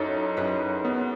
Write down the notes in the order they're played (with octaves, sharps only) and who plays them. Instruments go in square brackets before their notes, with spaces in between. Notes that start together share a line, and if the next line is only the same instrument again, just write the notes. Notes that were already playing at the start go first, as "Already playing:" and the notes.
Already playing: [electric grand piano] F#2 D#4 [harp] C#4 E4 A4 C#5
[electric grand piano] F#2 [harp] G#4 B4
[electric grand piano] B3